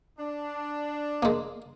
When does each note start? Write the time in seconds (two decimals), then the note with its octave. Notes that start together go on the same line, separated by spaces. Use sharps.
0.18 D4
1.23 G#3 A#3